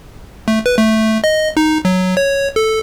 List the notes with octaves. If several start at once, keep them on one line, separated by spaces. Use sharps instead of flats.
A3
B4
A3
D#5
D#4
F#3
C#5
A4